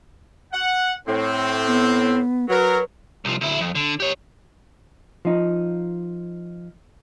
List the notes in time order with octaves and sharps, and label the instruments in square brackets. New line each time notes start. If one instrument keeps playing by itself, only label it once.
[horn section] F#5
A2 C4
[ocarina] B3
[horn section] F#3 A#4 [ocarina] B4
[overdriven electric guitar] C2 F3
D2 E4
F2
D3
G4 C#5
[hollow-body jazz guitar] F3 D#4